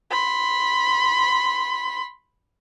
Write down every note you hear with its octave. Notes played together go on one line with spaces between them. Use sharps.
B5 C6